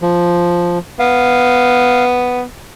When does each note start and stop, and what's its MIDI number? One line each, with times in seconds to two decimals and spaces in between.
0.02 0.79 53
0.99 2.43 59
0.99 2.05 77